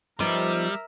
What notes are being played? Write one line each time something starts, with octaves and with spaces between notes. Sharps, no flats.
F3 G3 B3 D#4 A#4 E5